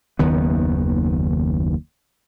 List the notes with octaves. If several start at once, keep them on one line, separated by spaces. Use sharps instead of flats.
F#1 D#2 D#3 B3